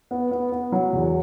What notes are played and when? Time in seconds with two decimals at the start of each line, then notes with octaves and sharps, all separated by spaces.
0.11 B3
0.31 B3
0.52 B3
0.72 F#3
0.93 E2